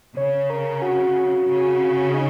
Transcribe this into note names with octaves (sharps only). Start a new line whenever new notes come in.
C#3 C#5
A#4
F#4
C#3
D#4